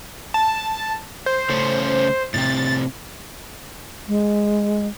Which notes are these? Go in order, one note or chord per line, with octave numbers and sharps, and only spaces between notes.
A5
C5
C#3 A3 C#4
A2 C3 C4 A6
G#3